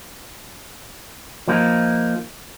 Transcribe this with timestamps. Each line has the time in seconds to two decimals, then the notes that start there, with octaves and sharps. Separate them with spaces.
1.48 F3 A#3 D#4